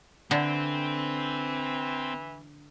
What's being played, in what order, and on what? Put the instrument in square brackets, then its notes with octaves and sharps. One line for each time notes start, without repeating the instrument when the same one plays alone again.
[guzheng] D3 [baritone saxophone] E3 [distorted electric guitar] C4